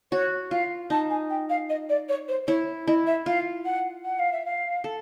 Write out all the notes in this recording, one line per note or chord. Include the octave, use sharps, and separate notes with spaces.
F#4 C#5
F4 F5
D#4 A5
G#5
G5
F5
D#5
D5
C#5
C5
E4 C#5
E4 D#5
E5
F4 F5
F#5
F#5
F5
E5
F5
A4